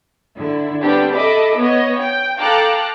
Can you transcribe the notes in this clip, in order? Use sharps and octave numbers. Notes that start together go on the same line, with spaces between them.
D3 E4
G3 B3 C4 D4 G4
A4 D#5 E5 B5 D6
B3 C#5 D#5
G5
A4 F5 G5 A#5 D6 F#6